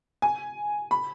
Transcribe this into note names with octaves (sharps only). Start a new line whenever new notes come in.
G#5
B5